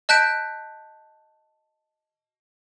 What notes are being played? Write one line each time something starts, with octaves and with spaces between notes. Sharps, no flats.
D#5 A5 F#6 G6 B6 D7